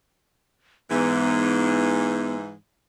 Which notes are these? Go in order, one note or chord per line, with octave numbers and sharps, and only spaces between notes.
G#2 E3 B3